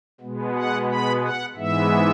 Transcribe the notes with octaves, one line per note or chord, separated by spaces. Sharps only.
B2 G#3 B3
F#5
B5
F#5
G#2 E3 G#3 B3 E5